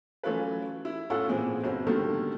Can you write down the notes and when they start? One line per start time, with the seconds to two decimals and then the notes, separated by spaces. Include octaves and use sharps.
0.23 E3 F#3 A3 C#4 F4 B4
0.85 E4
1.10 A2 A3 F4 F#5 E6
1.29 A#2 E3 G#3 B3 C4
1.63 G1 C4 F#4
1.87 B2 D3 D#3 G3 A3 A#3